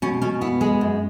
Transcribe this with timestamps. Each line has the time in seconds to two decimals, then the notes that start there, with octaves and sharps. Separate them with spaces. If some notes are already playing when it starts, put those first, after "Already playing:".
0.02 B2 C#4
0.22 B2 C#4
0.41 B3 E4
0.61 G#3 G#4
0.81 F#2